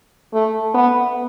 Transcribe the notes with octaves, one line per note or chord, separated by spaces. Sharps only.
A3
B3